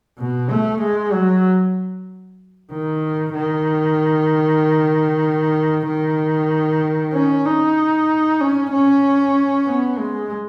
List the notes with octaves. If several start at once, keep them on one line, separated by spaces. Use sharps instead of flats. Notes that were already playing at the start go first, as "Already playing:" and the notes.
B2
A3
G#3
F#3
D#3
D#3
D#3
C#4
D#4
C#4
C#4
B3
G#3